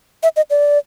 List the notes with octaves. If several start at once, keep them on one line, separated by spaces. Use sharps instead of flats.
E5
D#5
D5